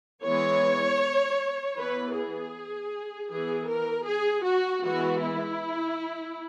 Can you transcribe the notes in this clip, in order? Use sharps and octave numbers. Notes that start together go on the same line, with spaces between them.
E3 G#3 B3 C#5
E3 B3 B4
G#4
E3 B3 G#4
A#4
G#4
F#4
E3 G#3 B3 F#4
E4